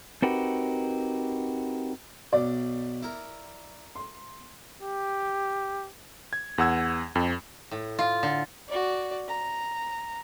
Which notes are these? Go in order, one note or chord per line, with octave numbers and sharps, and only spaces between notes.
C4 D#4 F#4 G4 A#4 B4
B1 D5
E4 A#4
C6
G4
G#6
E2 F#5 E6 G#6
F2
A2
F4
D3
F#4 D5
A#5